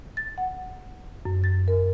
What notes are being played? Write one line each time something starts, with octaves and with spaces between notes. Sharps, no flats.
A6
F#5
F#2
A6
A#4